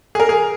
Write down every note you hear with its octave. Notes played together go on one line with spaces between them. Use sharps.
G#4
A#4
G#4